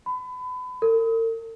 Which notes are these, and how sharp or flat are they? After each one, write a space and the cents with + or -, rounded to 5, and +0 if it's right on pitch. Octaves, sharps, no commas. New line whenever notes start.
B5 +30
A#4 -45